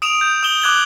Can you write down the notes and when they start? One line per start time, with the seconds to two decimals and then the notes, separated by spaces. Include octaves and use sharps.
0.02 D#6 D7 E7 F7
0.21 G6
0.43 D#6 E7 G7
0.62 D6 F#6 G#6 F#7 G7